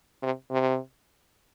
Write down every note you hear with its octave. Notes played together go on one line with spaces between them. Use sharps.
C3
C3